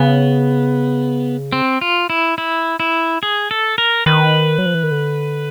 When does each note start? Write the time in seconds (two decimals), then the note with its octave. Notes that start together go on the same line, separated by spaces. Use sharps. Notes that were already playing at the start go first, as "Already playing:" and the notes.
Already playing: C#3 B3
1.52 C4
1.81 F4
2.10 E4
2.38 E4
2.80 E4
3.23 G#4
3.51 A4
3.78 A#4
4.06 D#3 B4
4.58 F#3
4.66 F3
4.74 E3
4.83 D#3
4.91 D3